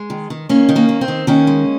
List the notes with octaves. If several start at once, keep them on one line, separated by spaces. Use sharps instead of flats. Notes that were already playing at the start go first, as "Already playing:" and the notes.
Already playing: G#3
D#3
D#3
D#3 A#3 C#4
D#3
A#3 C#4
D#3
C4
D#3
D#3 A#3 C#4
G#3